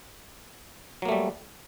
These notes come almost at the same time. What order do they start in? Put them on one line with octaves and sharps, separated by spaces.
F#3 A#3 A3 G3